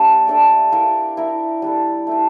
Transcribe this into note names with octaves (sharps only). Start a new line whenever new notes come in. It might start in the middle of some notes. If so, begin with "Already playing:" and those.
Already playing: A#3 D4 G4 A#4
A3 D4 A4 D5
E4 G4 A#4 F5
E4 A#4 E5
G3 D4 A4
A3 E4 G4